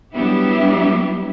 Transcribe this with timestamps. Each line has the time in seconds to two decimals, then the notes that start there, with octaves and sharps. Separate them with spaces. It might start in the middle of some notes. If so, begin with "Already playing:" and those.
0.12 F#3 G3 B3 D4 E4 G4